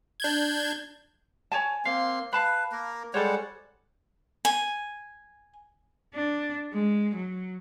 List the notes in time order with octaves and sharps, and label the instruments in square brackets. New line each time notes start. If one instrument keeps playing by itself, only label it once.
[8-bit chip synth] D4 G6 G#6
[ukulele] C#5 G#5 A5
[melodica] A#3 C4 C6 [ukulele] F5
[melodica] B4 [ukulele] F5 A5 B5
[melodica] A#3 A#4
[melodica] G3 G#3 F#5 [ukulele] A4 C5 C#5
[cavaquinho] G#5
[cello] D4
G#3
F#3